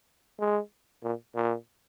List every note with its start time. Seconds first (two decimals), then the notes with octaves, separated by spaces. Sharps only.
0.40 G#3
1.03 A#2
1.35 A#2